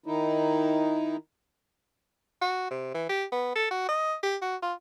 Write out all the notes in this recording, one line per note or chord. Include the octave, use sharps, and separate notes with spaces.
D#3 D#4 E4
F#4
C3
E3
G4
B3
A4
F#4
D#5
G4
F#4
F4